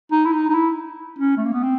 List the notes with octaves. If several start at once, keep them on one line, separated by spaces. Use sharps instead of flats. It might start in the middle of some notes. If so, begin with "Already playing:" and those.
D#4
E4
D#4
D#4
E4
C#4
A3
A#3
B3
C4